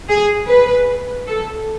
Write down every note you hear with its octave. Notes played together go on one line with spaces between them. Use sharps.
G#4
B4
A4